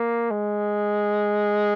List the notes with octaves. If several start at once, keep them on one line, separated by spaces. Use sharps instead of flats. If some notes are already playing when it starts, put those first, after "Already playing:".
Already playing: A#3
G#3